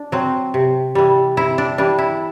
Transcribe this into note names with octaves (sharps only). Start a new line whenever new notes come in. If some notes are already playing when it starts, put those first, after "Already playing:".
Already playing: D4
F#3 C4
C3
E3 G3
C3 E4
D4
E3 G3 D4
E4